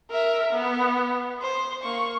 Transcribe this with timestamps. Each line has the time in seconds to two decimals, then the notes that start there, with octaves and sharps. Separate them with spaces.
0.11 A#4 E5
0.53 B3
1.42 C5
1.83 A#3 C#6